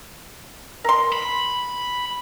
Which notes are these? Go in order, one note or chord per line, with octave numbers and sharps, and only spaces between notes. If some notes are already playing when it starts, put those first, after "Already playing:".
A#4 C6
B5